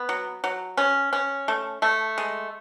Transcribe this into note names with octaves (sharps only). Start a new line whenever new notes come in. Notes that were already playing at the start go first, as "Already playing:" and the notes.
Already playing: B3
F#3
F#3
C#4
C#4
A3
A3
G#3